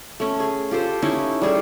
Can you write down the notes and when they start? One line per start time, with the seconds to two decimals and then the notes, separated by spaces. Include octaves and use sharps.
0.20 A3 C#4
0.40 G#4
0.71 F4 G4 A4 C5
1.02 C#4 D#4 E4
1.41 G3 G#4 A4